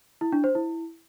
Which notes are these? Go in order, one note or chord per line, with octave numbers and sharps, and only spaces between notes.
E4
D4
C5
E4